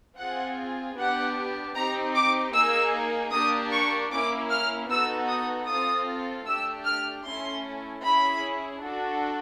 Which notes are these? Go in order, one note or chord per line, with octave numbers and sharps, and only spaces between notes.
C4 F4 G#4 F#5
B3 D4 G4 F#5
C4 D#4 G4 A#5
D6
A#3 D#4 G#4 E6
A#3 D4 G4 D#6
C#6
A#3 C#4 E4 D6
F6
B3 D#4 F#4 A4 E6
D#6
C4 F4 A4 D#6
A3 D4 G4 E6
F6
A3 C#4 E4 C6
C#4 E4 G#4 B5
D4 F#4 A4